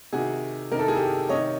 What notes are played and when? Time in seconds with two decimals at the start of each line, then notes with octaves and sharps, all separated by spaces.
0.13 C3 D#3 F#4 G#4
0.71 C3 D#3 A#4
0.79 A4
0.88 G#4
0.95 G4 A4
1.29 C3 D#3 C#5 D#5